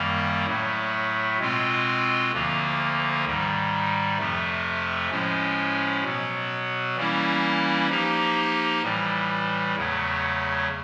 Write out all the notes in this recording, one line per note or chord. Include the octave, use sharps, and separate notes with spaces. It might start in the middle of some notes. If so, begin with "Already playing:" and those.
Already playing: F#2 D#3 G3 A#3
A2 F#3 A3
B2 G#3 C4 F4
D2 D3 F3 A#3
G#2 D#3 G3
F2 C3 F3 A3
A2 F3 G#3 C#4
B2 F#3 B3
E3 G3 A#3 C#4 E4
F3 A#3 D#4 G4
A2 E3 G3
E2 C#3 F#3 A3